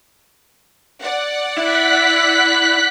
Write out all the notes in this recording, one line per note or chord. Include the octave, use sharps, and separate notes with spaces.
D5 F#5
E4 F#6 B6